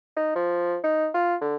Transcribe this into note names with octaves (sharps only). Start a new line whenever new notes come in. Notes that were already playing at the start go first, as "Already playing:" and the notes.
D#4
F3
D#4
F4
D3